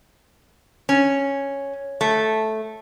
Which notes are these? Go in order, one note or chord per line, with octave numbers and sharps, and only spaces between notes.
C#4
A3